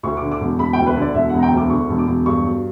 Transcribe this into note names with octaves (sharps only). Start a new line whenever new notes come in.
D2 C#6
D6
D3
D6
E1
E1 B5
G5
D2
B4
D3 D5
E1 E5
F#5
E1 A#5
G5
D2
D6
D3 C#6
E1
D6
E1
G2 C#6
F#3